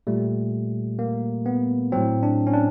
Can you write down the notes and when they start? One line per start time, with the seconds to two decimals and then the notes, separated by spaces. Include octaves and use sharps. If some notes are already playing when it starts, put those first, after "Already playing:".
0.07 A#2 G3 A3
0.99 A#3
1.46 B3
1.92 A2 F#3 C4
2.23 D4
2.47 C#4
2.53 D4